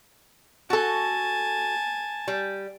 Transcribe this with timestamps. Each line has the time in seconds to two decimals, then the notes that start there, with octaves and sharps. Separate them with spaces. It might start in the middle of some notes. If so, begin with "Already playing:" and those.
0.70 F#4 A4 G#5 A5
2.28 G3